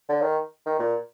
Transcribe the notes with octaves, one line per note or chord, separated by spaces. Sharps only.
D3
D#3
D#3
A#2